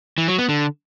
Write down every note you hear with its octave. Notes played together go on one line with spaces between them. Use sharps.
E3
F#3
B3
D3